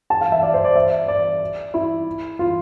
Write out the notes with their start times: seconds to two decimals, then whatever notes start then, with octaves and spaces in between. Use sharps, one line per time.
0.10 A5
0.21 F5
0.32 E5
0.43 D5
0.54 C5
0.64 D5
0.75 E5
1.08 D5
1.74 E4
2.39 F4